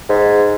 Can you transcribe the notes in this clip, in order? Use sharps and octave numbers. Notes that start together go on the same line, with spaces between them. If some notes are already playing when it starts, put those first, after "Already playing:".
G#2